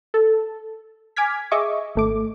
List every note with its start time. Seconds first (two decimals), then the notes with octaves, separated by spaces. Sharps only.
0.14 A4
1.16 G#5 D6 F6 G#6 B6
1.51 G#4 D#5 E5 C#6 D6
1.95 G#1 A3 D6